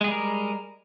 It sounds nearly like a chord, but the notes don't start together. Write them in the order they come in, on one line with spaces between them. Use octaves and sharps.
G#3 G#4 G3 A#4